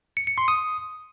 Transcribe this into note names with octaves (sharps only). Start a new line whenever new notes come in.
C#7
C#7
C6
D#6